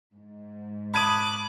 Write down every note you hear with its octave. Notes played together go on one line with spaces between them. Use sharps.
G#2
A5 B5 D6 D#6 F#6 G#6 D#7